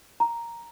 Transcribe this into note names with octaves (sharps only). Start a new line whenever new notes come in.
A#5